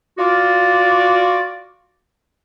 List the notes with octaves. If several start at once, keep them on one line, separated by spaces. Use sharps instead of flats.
F4 F#4 D5